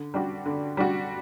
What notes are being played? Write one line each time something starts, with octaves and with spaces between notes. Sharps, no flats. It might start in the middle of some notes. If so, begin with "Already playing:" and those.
Already playing: D3
G3 D4 F#4
D3
G3 D4 F#4